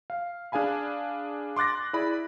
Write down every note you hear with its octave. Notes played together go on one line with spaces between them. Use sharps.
F5
D4 G#4 F5 G#5 B5
C6 D6 F#6 A6 A#6
E4 G#4 D5 B5